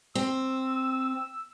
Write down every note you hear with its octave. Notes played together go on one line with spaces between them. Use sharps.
C4 E6